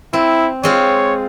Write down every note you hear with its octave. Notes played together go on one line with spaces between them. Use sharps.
C4 E4
G#3 C4 F4 C#5